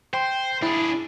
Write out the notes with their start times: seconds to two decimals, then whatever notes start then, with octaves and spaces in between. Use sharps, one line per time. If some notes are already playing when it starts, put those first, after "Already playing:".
0.14 C5 G5 C6
0.62 D4 E4 G#4